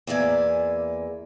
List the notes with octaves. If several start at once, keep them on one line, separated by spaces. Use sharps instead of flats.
E2 A#3 D5 E5 G#5